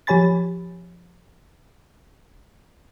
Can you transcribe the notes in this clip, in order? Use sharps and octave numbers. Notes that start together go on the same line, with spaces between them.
F3 G4 C#5 G#5 B5 A6